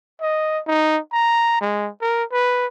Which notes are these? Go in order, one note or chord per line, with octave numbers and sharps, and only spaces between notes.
D#5
D#4
A#5
G#3
A#4
B4